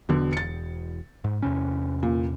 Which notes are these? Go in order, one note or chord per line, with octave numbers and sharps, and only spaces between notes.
E1 B2 D3
A6 C#7
G#2
E2 C3 C#4
A#2